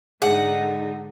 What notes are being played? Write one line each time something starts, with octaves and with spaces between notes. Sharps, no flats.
G#2 D3 D#4 G#4 F#5